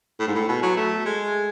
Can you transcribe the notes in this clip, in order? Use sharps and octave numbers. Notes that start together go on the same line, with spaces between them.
A2
G#2
A2
B2
F#3
A3
G#3